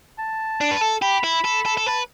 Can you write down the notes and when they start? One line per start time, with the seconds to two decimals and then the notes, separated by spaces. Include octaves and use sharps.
0.19 A5
0.61 D4
0.71 B4
0.81 A4
1.02 G4 B5
1.24 E4
1.44 A4
1.65 A4
1.77 A4
1.86 B4 A5